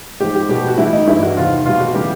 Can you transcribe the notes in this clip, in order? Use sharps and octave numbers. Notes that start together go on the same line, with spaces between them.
G#2 F3 G4
G4
B2 G3 G4
F#4
A2 E3 G3 E4
D#4
G2 E3 G3 E4
F#4
E2 C3 D#3 F4
B2 G3 F4
F#4
C#3 E3 G3 G4